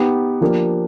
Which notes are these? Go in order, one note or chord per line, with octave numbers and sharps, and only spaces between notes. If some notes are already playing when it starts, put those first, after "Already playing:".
Already playing: B3 D#4 G4
F3 A#3 D4 G4